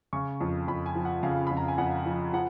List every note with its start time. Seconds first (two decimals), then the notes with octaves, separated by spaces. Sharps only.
0.13 C#3 C#6
0.41 F2
0.68 F2 B5
0.86 G#5
0.96 F3
1.05 F#5
1.23 C#3 F5
1.47 F2 B5
1.57 A#5
1.68 G#5
1.78 F2 F#5
2.06 F3
2.33 F3 F#5